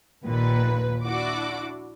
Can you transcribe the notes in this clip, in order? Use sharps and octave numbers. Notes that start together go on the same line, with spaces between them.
A#1 D#2 A#2 B4
D4 E4 F#4 D6